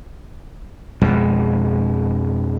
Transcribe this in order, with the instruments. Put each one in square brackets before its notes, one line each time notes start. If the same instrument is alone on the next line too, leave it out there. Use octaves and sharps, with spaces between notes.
[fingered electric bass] F2 B2 G#3